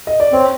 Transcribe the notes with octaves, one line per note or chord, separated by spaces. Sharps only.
D#5
D5
C4 C#5